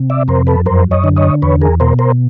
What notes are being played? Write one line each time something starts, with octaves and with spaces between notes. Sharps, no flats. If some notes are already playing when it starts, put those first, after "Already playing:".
Already playing: C3
D5 E5
F2 A#4 C5
A4 B4
F#2 A#4 C5
C#5 D#5
D3
C#5 D#5
E2 B4 C#5
G#4 A#4
B2 A#4 C5
A#4 C5